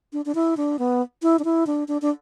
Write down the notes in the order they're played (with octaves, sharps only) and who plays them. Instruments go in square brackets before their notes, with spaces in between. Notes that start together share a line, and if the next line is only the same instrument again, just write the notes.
[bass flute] D4
D4
E4
D4
B3
E4
D4
E4
D4
D4
D4